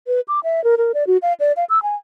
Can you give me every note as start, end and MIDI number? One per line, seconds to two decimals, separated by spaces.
0.07 0.20 71
0.28 0.40 86
0.44 0.63 76
0.64 0.75 70
0.78 0.92 70
0.94 1.04 74
1.07 1.17 66
1.22 1.33 77
1.40 1.52 74
1.57 1.65 77
1.70 1.82 88
1.83 1.95 80